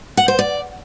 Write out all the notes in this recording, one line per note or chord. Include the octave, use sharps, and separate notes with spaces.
F#5
C5
D5